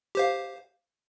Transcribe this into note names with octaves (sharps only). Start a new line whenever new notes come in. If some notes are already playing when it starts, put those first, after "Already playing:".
G4 C5 F5